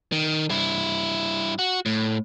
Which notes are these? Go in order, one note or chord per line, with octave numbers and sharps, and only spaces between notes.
D#3
G2 E4
F#4
A2